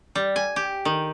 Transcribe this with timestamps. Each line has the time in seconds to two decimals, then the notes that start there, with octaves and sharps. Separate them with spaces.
0.15 G3
0.36 G#5
0.56 G4
0.85 D#3